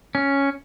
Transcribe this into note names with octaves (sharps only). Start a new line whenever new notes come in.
C#4